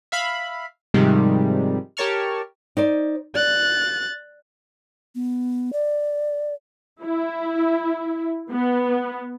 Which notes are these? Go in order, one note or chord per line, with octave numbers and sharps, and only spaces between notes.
E5 F5 B5
G#2 C3 D#3 F3 G3 G#3
G4 A#4 C#5 A5 C#6 F6
D#4 C5 D5
D5 F#6 A6
B3
D5
E4
B3